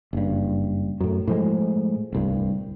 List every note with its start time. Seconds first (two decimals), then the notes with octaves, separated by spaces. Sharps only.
0.13 F#1 G2
1.00 F#2 A2
1.27 A2 F3 G#3
2.12 D1 C2 G2